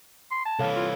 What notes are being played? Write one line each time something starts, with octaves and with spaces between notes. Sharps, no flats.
C6
A5
C2 E3 A4 C#5 F5
F4